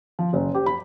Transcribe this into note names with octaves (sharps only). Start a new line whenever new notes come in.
F3
F#1
G4
B5